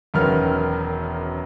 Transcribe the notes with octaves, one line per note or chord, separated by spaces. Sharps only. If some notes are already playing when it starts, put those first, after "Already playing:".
E1 F#2 D#3 B3 F6